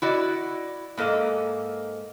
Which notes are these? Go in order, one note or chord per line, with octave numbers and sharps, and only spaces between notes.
E4 F#4 D5 D#5
G#2 A#3 A4 D#5